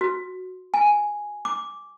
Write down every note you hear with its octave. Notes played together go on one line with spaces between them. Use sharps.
F#4
G#5
D6